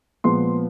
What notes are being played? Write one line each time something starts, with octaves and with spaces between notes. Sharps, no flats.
A#2 F3 G#3 B3 C6